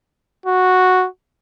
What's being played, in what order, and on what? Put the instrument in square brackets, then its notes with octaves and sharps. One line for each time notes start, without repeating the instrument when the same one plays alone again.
[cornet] F#4